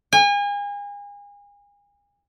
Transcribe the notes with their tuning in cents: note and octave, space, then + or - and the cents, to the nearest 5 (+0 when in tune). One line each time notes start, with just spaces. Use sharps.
G#5 -35